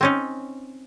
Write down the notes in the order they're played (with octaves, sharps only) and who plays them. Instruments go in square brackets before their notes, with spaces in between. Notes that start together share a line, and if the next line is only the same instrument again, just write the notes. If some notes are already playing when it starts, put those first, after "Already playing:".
[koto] C4 C#4 D#4